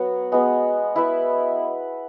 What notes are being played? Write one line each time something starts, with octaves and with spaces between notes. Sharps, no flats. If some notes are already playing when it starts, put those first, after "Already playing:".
Already playing: F#3 B3 F#4 C#5
G#3 B3 F#4
E4 B4 E5